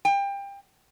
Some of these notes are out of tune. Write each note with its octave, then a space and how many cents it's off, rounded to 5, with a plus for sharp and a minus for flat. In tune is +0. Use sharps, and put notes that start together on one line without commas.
G5 +25